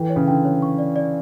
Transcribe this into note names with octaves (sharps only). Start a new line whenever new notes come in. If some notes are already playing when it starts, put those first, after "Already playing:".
Already playing: E3 A4 G5
C#5
C#3
D3 G5
C#5
C#6
D5
D5